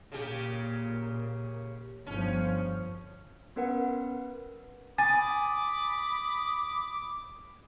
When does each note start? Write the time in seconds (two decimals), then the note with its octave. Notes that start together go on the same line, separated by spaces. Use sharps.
0.12 A#2 C#3 G4
2.06 G1 F3 C#4
3.56 B3 C#4 A#4 B4 F#5
4.98 G#5 B5 D6 D#6 A6